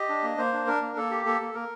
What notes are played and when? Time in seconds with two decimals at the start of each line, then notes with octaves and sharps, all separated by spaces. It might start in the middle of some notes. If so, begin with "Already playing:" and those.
Already playing: G4 D#5
0.09 D4
0.23 A#3
0.38 A#3 C5
0.53 D4
0.67 D4 A#4
0.82 A#3
0.96 A#3 A4
1.11 G4
1.25 A#3 A4
1.40 A#3
1.54 A#3 A#4